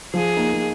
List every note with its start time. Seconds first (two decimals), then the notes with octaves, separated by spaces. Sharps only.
0.14 F3 G#4
0.37 A#3 D#4
0.53 A#3